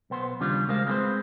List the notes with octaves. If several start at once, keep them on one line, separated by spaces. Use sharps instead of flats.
B1 B3 C5
D#2 C#3 G3 D4 F4
C#2 G#3 A#4 C5 F5
G#3 C4 E4 F#4 B4 C5